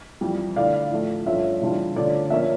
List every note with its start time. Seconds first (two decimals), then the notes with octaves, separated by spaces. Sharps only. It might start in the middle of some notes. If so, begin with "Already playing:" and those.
0.21 F2 E3 G3
0.56 D3 A3 E4 D5 F5
0.91 A2 F3 A3
1.26 G2 F3 A3 C#4 F4 E5
1.61 C#3 E3 G3 D4 F4
1.96 D3 A3 C#4 F4 D5
2.30 A#2 F3 A#3 C#4 E5